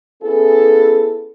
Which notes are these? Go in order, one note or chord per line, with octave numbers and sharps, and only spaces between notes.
B3 C#4 E4 G#4 A4